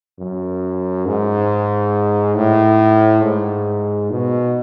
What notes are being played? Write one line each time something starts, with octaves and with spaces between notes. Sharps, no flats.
F#2
G#2
A2
G#2
B2